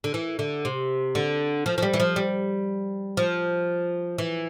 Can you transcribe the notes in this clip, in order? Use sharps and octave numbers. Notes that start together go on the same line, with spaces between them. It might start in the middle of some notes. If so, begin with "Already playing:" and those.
D3
E3
D3
C3
D3
F3
F3
G3
E3
F3
G3
F3
E3